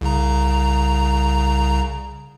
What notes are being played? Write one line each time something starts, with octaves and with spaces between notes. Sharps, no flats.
C2 C#3 A#5